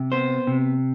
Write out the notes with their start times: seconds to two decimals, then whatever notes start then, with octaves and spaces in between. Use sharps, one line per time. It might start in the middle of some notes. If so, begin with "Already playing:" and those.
Already playing: C3
0.12 B3 C5
0.47 C3